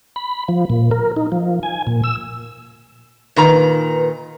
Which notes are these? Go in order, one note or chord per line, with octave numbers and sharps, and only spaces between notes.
B5
F3
A#2
A#4
D#4
F3
G#5
A#2
E6
A#2 D#3 B4 A#5